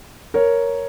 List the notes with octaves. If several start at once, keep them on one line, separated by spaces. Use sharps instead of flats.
A#4 C#5